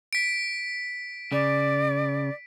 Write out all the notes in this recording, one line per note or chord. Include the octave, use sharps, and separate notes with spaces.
B6 D7
C#3 D5